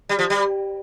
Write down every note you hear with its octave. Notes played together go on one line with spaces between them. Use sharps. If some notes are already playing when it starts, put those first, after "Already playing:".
G3
F3
G3